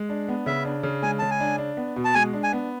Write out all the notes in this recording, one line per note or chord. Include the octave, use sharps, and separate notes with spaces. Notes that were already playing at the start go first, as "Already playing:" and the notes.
Already playing: G#3
D4
B3
C#3 E5
D4
C#3
G#3 G#5
C#3 A5
G#5
D4
D4
B3
B2
A5
G#3 G#5
D4
G#5
B3